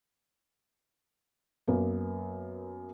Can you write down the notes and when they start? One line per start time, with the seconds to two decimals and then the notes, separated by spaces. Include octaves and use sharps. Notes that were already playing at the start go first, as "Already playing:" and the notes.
1.68 F#2 A#3 B3